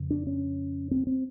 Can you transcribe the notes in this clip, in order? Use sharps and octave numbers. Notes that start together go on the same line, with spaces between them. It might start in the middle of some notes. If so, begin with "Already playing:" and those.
Already playing: F2 C#3
D4
C#4
C4
C4